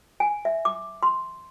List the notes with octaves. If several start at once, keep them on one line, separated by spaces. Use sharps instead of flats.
G#5
E5
D6
C6